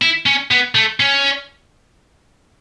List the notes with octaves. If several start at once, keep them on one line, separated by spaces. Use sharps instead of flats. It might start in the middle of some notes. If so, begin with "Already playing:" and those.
E4
C#4
B3
A3
C#4